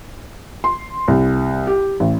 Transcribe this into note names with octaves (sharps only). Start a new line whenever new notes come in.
C6
C2
G4
A1